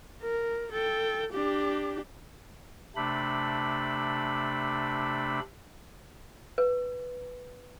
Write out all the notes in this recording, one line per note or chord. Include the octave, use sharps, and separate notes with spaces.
A#4
A4 G5
D4 G4
C3 A3 D4 B5
B4